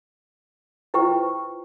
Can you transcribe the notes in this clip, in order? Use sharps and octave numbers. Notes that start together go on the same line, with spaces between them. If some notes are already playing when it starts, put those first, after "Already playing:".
E4 F4 B4 C5 G5 C#6